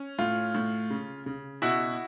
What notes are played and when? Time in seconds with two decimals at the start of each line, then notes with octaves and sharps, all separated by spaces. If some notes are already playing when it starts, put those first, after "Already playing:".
Already playing: C#4
0.19 A2 F4
0.55 A2
0.91 C#3
1.26 C#3
1.62 B2 E4 F#4